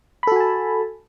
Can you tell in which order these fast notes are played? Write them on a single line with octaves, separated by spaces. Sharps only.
B5 A4 F#4 G#5 A5